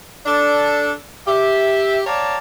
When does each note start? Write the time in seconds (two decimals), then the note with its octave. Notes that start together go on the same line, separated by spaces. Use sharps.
0.25 D4 A4
1.27 G4 E5
2.06 C#5 D5 F5 G5 A5 A#5